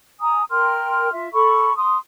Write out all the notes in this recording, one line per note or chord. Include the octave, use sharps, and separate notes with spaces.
G#5 A#5 D#6
A#4 G5 C6 F6
F4 E5
A4 B5 C#6
C6 D#6